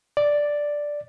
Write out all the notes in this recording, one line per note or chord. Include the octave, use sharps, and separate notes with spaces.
D5